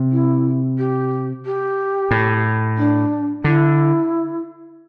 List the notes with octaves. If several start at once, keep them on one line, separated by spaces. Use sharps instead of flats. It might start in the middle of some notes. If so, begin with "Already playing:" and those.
Already playing: C3
E4
G4
G4
A2
D4
D3 E4